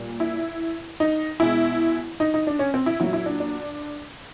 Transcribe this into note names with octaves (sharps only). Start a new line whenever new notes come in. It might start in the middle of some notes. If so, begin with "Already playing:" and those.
Already playing: A#2 G3
E4
D#4
B2 G#3 E4
D#4
D#4
D4
C#4
C4
E4
A#2 F#3 E4
E4
D4
D4